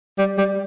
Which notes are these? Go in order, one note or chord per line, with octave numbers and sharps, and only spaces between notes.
G3
G3